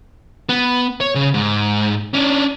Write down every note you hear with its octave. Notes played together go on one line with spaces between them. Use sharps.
B3
C#5
C#3
G#2
C#4 D4